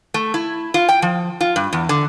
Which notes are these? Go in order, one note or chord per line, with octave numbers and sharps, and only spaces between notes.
A3
E4
F4
G5
F3
F4
G2
E2
D3